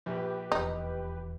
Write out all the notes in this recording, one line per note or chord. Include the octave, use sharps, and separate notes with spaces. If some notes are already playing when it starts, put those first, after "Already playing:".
A#1 G4 B4
D#1 E2 D#4